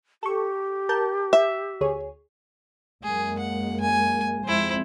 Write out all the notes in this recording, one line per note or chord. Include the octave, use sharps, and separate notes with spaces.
G4 A4 C#6
A#4 A5 G6
E5
D2 G#4 C#5
F#2 G#3 A#3 G#4
F#5
G#5
F2 G#3 C4 E4 C5